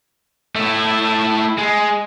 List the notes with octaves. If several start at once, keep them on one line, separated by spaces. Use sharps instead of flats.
A3 E4
G#3